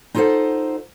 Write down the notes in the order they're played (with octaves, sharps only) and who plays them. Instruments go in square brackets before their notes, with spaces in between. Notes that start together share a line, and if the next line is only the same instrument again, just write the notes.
[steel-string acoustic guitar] D#4 F4 A4 B4 C5 F#5